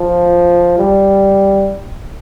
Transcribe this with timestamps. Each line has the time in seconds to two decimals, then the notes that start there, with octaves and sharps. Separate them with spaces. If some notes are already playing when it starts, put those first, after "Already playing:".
Already playing: F3
0.78 G3